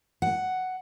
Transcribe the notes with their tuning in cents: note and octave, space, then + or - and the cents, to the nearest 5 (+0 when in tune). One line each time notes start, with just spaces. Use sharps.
F#5 +5